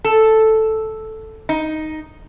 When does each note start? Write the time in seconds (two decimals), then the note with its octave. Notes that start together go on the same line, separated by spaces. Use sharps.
0.04 A4
1.49 D#4